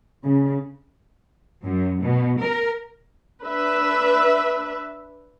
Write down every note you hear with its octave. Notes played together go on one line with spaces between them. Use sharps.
C#3
F#2
B2
A#4
D4 B4 E5